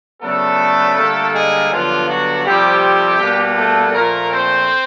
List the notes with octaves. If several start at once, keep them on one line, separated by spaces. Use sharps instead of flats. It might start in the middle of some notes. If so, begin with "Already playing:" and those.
C#3 F#3 A3 B3 D4 A4
D3 G3 A#3
G#3 G#4
G2 D3 F3 F#3 B3 D4 F4
F#3 F#4
C3 F3 G3 A3 C4 G4
B2 G3 A#3 D4
A3 A4
A#2 F3 A3 A#3 A#4
C4 C5